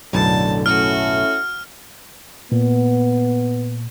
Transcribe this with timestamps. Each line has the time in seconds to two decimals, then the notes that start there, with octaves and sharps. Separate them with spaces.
0.13 B1 F#2 A2 D3 A5
0.66 A3 C#4 E4 F#4 F6
2.52 A#2 B3